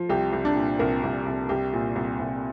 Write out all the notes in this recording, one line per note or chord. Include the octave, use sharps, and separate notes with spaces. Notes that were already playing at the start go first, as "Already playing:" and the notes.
Already playing: F3
C2 G4
C2
D4
A#2
C2 A#4
C2
C2
C2 G4
A#2
C2
C2